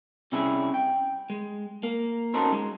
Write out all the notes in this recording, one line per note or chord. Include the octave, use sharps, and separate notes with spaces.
C3 G3 C#4 E4 G#4
G5
G#3
A#3
C#4 D#4 F#4 A4 A#4 C5
G#3